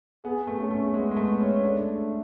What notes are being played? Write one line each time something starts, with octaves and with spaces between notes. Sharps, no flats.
B3 G#4
A3
C#4
A3
G#3 B3
G#3
A3
C#4
A3 D4